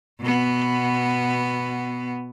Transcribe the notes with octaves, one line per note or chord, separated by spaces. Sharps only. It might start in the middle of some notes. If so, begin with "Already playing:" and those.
B2 B3